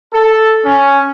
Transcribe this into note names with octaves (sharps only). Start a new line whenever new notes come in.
A4
C#4